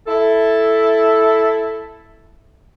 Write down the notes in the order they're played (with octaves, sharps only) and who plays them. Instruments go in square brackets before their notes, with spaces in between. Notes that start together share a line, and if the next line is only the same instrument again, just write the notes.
[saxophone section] E4 A4